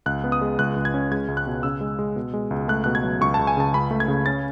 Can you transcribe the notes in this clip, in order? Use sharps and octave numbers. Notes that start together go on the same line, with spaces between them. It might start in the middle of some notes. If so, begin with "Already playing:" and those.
C#2 F#6
B3
D#6
G#3
C#2 F#6
C#2
G#6
C#4
G#3 G#6
C#2
F#6
B2
C#3 E6
G#3
G#3
B2
G#3
C#2
A3 F#6
B2 F#6
G#6
F#3
C#2 C#6
C#2 A5
G#5
C#3 A5
C#2 B5
A3
G#6
C#3
C#4 A6